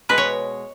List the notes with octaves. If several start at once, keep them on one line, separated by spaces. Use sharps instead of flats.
B2 G#3 B4
C#5